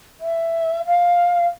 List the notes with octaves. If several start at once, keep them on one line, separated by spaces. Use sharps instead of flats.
E5
F5